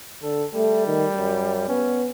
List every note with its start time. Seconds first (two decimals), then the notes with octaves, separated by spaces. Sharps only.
0.23 D3 A4
0.54 G3 A3
0.87 D#3
1.17 F#2
1.68 B3 C#4